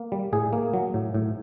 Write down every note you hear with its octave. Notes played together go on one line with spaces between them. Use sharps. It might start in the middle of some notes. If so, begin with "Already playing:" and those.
Already playing: A#3
G3
A2 G#4
A#3
F#3
A2
A2